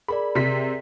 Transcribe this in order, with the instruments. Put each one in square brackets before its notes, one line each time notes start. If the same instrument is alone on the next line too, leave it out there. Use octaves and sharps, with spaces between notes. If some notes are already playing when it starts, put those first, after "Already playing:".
[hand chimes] G#4 A#4 D5 [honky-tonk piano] B5
[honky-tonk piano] C3 B6